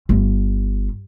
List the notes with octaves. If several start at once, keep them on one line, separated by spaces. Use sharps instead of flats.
G1